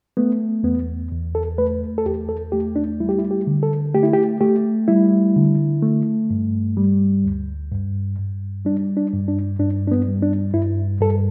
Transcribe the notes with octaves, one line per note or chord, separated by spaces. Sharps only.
A3 B3
E2 B3
E2
A4
A3 B4
A4
E2 G4
A4
A3 G4
D4
G3 E4
G4
E4
G4
D3
A4
A3 G4
E4
G4
A3 G4
G3 E4
D3
A3
G2
G3
D2
G2
G2
G3 D4
D4
G2
D4
G2 D4
D4
B3
G3
D4
G2 E4
G2 A4